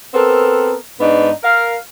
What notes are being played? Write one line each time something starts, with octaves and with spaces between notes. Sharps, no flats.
B3 C4 A4 A#4
G#2 B3 D4 D#4
A#4 F5